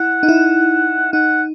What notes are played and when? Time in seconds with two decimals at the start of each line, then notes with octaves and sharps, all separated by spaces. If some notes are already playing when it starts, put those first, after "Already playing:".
Already playing: E4 F#5
0.23 D#4
0.29 E4
1.13 D#4 F#5